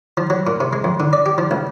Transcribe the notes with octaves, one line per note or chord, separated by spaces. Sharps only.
F3
F#3
A#2
C3
G#3
F2
D3
D5
G4
F3
C#2